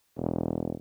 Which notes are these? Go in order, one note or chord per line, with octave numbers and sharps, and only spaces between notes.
E1